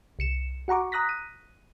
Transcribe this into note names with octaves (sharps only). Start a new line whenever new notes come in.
C2 C#7 E7
F#4 F#5 A#5 C#6 D6
A#5 D#6 F#6 A#6 B6
D#7